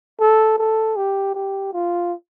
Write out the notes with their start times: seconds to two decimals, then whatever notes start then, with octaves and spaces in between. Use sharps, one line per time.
0.20 A4
0.58 A4
0.96 G4
1.35 G4
1.73 F4